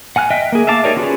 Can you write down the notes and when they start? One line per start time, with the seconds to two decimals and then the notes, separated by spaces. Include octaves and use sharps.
0.16 F#5 G#5 F6 F#6
0.30 D#5 E5 G5
0.52 A#3 G#4
0.67 E5 F5 A5 D6
0.84 D#4 G4 A#4 C#5 D5
0.97 C#4 F4 F#4 G#4 B4